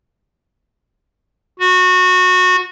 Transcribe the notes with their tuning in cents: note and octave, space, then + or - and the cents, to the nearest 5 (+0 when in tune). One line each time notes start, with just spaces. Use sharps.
F#4 -20